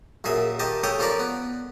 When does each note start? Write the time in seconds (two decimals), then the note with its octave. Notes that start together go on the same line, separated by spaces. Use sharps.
0.24 A#1 F#2 G#4 E5
0.59 D#3 G4 D#5 A5
0.84 C#3 G4 A4 C#5 G5 D#6
0.99 F3 C#4 F4 A#4 D5
1.19 B3